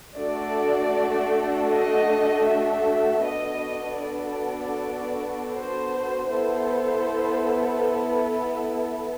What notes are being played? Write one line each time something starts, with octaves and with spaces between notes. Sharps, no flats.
A3 D4 F#4 A4 D5
D#5
E5
B3 D4 F#4 A4 D#5
D5
C5
B3 E4 A4 C5